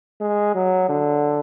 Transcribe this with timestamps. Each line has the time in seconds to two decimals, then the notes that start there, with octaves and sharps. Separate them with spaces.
0.21 G#3
0.55 F#3
0.89 D3